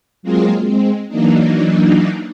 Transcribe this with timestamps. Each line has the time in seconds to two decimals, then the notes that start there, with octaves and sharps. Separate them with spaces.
0.23 F#3 G#3 A#3 C4 F4 G#4
0.63 G#3 C4
1.08 E3 F#3 A#3 D4 D#4